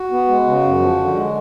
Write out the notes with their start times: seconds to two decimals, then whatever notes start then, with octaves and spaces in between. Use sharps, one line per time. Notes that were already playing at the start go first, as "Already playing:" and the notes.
Already playing: F#4
0.11 B3
0.27 G#3
0.45 C#3
0.63 F#2
0.80 F3
0.97 D3
1.14 G#3